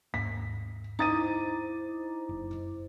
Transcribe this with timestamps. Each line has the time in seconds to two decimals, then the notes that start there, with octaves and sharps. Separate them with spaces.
0.14 D#2 G#2 A#3 B6
0.99 D#4 E4 C5 A#5 D6 D#6 A6 D#7
2.29 F#1